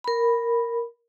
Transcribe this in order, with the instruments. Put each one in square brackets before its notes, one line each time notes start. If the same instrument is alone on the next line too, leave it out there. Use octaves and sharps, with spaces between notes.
[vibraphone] A#4 B5